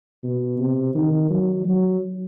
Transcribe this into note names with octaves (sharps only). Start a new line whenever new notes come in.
B2
C3
D#3
F#3
F#3